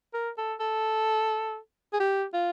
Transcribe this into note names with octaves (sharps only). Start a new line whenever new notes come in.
A#4
A4
A4
G#4
G4
F4